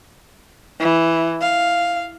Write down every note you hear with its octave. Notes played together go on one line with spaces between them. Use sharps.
E3
F5